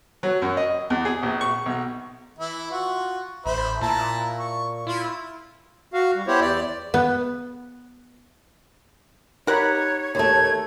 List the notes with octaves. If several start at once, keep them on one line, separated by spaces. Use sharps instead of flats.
F#3
F#2
D#5
E2
G#4
A#1
C#6
B1
E3 E4
F4 F#4
A1 C5 E5 B5
A#2 E4 A5 A#5
C#6
E4 F4
F#4 F5
G3
B3 E4 G4 C5 C#5
E2 D5
B3
D#4 G4 A#4 C#5 F#5 B5
D#2 A3 C#5 G#6